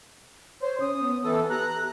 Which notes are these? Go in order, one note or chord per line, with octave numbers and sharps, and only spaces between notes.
C5 C#5
C#4 D#6
B3
E3 A4
G4 A#5 F#6